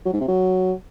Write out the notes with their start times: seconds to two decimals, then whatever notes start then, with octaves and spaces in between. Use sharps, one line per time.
0.05 F#3
0.13 G#2
0.20 C3
0.28 F#3